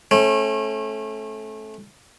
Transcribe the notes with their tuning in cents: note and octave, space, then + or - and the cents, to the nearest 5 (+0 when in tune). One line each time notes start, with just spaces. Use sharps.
A3 -20 C#4 -40